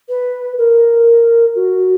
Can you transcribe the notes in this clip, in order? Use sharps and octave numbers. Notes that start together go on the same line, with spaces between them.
B4
A#4
F#4